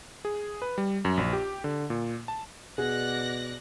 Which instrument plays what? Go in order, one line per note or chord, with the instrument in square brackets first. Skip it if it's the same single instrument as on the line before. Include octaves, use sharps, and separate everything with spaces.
[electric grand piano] G#4
B4
G3
F#2
A#1
G4
D3
A#2
A5
[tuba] B2 [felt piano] G#4 [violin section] D5 F#6 A#6 [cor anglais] F#5